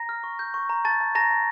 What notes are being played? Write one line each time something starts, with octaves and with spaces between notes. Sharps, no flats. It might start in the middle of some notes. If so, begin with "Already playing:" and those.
Already playing: A#5 A#6
F6
C#6
G6
C#6
A#5
A5 A6
A5
A5 A#5 A#6
A5